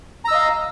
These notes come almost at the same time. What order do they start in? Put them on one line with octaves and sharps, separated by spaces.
A#5 E6 D#5 F5